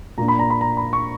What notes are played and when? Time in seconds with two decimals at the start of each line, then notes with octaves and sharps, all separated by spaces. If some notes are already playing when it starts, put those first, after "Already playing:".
0.18 A#2 A#3 D4 A#5
0.28 B5
0.39 A#5
0.50 B5
0.61 A#5
0.77 B5
0.93 C#6